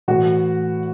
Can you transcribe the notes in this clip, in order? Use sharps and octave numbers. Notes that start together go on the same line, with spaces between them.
A2 E3 F#4